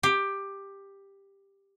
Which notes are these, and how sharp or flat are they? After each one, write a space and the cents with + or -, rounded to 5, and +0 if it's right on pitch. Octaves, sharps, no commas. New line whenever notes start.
G4 +10